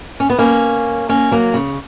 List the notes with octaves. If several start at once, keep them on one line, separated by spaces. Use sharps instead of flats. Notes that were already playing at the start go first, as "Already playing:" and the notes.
C#4
B3
A#3 C#4
A#3 C#4
F#3 A#3
C#3